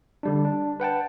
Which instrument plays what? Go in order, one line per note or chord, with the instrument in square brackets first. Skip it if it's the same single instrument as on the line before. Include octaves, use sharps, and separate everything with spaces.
[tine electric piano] D3 G3 D4
D4
B4 F#5 G5 A5